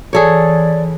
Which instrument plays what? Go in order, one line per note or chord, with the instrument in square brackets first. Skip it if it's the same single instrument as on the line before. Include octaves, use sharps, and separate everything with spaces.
[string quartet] E3 [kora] G#4 A4 C#5 [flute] D5